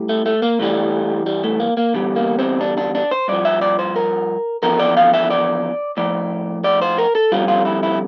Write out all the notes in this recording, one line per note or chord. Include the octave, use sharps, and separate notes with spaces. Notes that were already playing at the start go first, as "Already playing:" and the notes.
Already playing: A2 G3
A3
A3
A#3
G2 E3 G3 A3
G3
A3
A#3
A#3
E2 D3 G3
A#3
C4
D4
D4
D4
C5
G2 F3 D5
E5
D5
C5
A#4
E2 D3 F3 A#4
D5
F5
E5
D5
A2 F3 D5
D5
C5
A#4
A4
F2 D3 G3 F4
F4
E4
E4